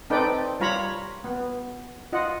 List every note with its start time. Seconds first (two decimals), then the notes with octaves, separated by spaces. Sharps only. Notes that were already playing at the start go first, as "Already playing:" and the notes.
0.10 C4 D#4 A4 B4 D5 G5
0.60 G3 F4 C#5 F5 A#5 B5
1.24 B3
2.13 F4 D#5 F#5